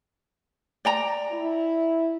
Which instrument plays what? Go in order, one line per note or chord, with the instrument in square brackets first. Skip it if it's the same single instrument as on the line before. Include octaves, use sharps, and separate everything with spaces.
[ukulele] D5 G5 A#5
[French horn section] E4